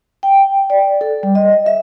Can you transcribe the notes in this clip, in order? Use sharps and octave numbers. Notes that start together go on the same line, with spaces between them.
G5
D5
A4
G3
D#5
E5